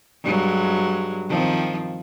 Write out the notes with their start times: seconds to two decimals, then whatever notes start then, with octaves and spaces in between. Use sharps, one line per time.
0.23 G2 F#3 G#3
1.29 D#3 F3 C4